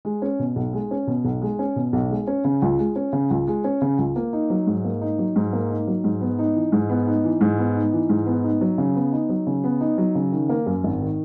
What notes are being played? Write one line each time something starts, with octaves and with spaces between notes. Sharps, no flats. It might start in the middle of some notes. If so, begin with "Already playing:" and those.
G#3
C#4
B2
B1
G#3
C#4
B2
B1
G#3
C#4
B2
B1
G#3
C#4
C#3
C#2
G#3
C#4
C#3
C#2
G#3
C#4
C#3
C#2
A#3
D#4
F#3
G#2
A#3
D#4
F#3
G#2
A#3
D#4
F#3
G#2
B3
D#4
E3
G#2
B3
D#4
E3
G#2
B3
D#4
E3
G#2
B3
D#4
F#3
C#3
B3
D#4
F#3
C#3
B3
D#4
F#3
C#3
D#3
A#3
F#2
G#1
D#3